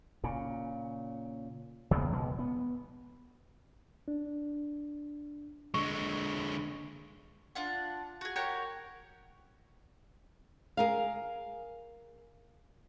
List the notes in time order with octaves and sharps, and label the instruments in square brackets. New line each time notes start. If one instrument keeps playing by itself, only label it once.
[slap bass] A#2 C#3
E2 C#3 A#3 B3
D2 B2 G#3
B3
[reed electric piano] D4
[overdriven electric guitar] D3 G#3 [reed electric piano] C#6
[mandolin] D4 F4 F#5
F#4 G#4
F#4 G4 A#4 C#5
[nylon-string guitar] G#4 A#4 F5